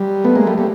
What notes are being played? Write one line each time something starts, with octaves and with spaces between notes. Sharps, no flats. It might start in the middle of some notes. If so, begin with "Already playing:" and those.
Already playing: G3
A3 B3
G#3 A#3
G3 A3
G3 A3